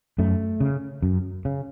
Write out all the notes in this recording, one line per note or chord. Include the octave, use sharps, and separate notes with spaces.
F#2 A3
C#3
F#2
C#3